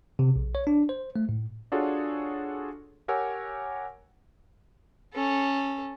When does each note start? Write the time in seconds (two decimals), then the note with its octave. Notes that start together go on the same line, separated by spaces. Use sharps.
0.19 C3
0.36 A#1
0.55 C#5
0.67 D4
0.89 C5
1.16 A3
1.29 A2
1.72 D4 F4 F#4 G#4 A4 C#5
3.08 G4 A#4 C#5 F#5 G#5 E6
5.13 C#4 A4